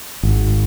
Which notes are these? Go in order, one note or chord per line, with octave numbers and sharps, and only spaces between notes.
G#1